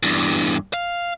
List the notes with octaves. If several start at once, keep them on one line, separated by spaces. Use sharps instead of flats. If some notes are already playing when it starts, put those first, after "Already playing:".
E2 G2
F5